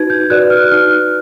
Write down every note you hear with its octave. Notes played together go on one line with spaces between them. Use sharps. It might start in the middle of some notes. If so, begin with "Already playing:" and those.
Already playing: D#4 F#4 B4 G#6
G6
F#4 B4 D5 F#6
F6
F#6
D#4 F6